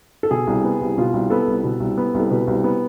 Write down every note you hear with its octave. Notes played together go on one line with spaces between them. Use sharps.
A4
B2 G#4
C2
B3
C2
B2 F4
C2
B3 A4
C2
B2
C2
B3
C2
A4
B2 B4
C2
B3